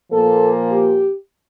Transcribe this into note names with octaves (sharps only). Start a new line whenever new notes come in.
A#2 F3 A#3 A4
G4